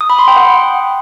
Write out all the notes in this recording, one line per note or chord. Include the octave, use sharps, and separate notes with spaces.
D#6
B5
C6
G5
F#5